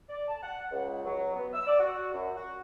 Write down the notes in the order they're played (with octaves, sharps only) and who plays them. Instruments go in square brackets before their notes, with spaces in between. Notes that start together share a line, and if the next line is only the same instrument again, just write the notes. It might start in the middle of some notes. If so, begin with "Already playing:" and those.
[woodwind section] D5
A5
F#5
C#2
F#3
B3
E6
D5
F#4
F#2
F#4